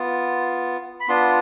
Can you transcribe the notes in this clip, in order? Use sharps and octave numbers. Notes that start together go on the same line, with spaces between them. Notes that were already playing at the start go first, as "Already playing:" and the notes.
Already playing: B3 F4
B5
B3 D4 F4 C6